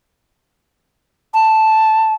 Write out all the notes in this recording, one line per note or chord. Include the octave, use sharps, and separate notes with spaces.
A5